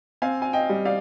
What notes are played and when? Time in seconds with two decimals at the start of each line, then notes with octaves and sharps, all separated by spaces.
0.22 C4 F5 G#5
0.42 G#5
0.53 D#5 G5
0.69 G3
0.85 D5 F5